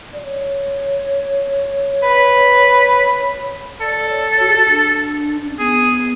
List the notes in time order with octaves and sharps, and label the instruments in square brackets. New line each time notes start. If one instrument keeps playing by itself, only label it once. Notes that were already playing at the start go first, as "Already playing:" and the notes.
[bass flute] D5
C#5
[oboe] B4
[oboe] A4 [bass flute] D5
[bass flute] C#5
F#4
G#4
F#4
D4
D4
C#4
[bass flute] B3 [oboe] G#4